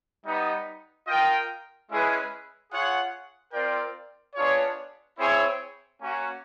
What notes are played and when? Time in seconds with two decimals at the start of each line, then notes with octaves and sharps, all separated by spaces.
0.24 G3 B3 D#4
1.07 F4 A#4 D#5 G5
1.89 G#3 C#4 E4 G#4 B4
2.71 F4 G#4 C#5 F#5
3.53 C4 F4 A#4 D5 G5
4.35 B3 D4 F4 G#4 C#5
5.18 C4 E4 G#4 C#5
5.99 A#3 C#4 F#4